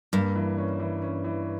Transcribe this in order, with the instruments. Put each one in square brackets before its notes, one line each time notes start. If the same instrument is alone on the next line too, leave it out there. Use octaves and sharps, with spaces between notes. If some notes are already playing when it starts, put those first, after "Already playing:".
[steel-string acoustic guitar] G2 [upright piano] A#3
[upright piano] E3
C#4
E3
C#4
E3